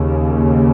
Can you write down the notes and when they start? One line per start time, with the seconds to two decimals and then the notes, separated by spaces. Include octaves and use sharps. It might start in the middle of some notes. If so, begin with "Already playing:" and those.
Already playing: D#2 C#3